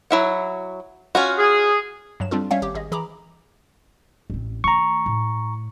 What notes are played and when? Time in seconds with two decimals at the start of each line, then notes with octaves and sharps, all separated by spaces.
0.11 F#3 E4 F#5
1.15 C#4 F4 F#4
1.38 G#4
2.20 G2 F#3 E7
2.31 G3 C4 D4 F4 A4
2.51 G3 C#4 C#5 E5 F5
2.62 G#1 G4 D6
2.74 G#1 G#4 D#5
2.92 E3 G#4 A#5 B5 D6
4.30 A1 C4
4.64 D#3 A3 A#5 C#6
5.06 A2